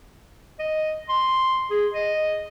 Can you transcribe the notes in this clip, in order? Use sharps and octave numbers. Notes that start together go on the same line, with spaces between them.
D#5
C6
G#4
D#5